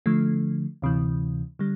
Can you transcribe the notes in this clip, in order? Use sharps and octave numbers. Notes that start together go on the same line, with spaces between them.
D3 F3 A3
D2 C3 E3
D3 G3